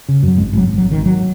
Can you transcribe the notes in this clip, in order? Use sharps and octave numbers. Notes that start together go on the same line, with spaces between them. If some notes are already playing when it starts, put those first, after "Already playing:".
C#3
F#2 F#3
G#1 G#3
G#1 F#3
G#1
G#1 F#3
D#3
G#1
F#3